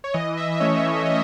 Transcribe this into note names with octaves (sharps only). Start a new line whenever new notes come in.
C#5
E3 D#5
E5
E5
A3 C#4 C#5
E3 D#5